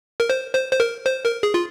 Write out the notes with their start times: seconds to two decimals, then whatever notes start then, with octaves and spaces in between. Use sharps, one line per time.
0.20 A#4
0.30 C5
0.54 C5
0.72 C5
0.80 A#4
1.06 C5
1.25 A#4
1.43 G#4
1.54 F4